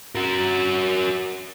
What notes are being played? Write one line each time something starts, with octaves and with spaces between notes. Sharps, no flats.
F#4 A#4